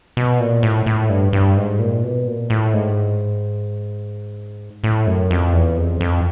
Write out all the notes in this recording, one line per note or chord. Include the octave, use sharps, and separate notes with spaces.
B2
A#2
A2
A2
G2
G2
G#2
A#2
B2
A#2
A2
G#2
A2
F#2
F2
E2
F2
F2